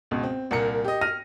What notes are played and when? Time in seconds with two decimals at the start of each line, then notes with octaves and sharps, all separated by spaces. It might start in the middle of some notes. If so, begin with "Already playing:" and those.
0.11 C#2 B2
0.23 C4
0.51 C2 A#2 A#4 C#7
0.84 G4 D#5
1.01 F6 A#6 D#7